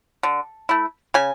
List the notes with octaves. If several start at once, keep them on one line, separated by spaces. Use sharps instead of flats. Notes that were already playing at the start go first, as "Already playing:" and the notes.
D3
A3 E4
C#3 G#5